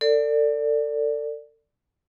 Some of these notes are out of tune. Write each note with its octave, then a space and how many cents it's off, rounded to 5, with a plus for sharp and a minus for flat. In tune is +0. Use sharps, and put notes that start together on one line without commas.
A4 +35 D5 +0